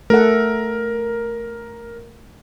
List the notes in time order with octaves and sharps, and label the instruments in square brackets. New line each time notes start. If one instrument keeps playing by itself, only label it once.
[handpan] A3 A4 F#5 [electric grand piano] A#4